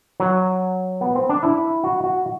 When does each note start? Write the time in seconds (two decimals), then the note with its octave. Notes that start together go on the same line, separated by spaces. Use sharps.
0.20 F#3
1.01 B3
1.15 C4
1.29 D4
1.43 E4
1.84 F#4
2.04 F#4